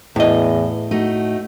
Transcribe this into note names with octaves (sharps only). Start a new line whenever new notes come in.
E2 A2 D#5
A3 D#4 F#4